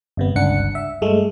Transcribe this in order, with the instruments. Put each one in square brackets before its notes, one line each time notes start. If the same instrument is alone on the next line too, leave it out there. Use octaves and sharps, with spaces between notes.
[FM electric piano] G1 C3 B3
G1 C#2 D4 F#5 C#7
E5
G2 G#3 A3